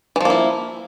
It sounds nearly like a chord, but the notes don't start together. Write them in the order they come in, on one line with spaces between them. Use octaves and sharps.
E3 F3 A#3 E4